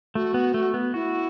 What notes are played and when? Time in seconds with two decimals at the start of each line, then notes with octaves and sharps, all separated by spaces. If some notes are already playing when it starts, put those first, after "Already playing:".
0.15 A3 F#4
0.34 B3
0.54 A3
0.74 B3
0.94 E4 F#4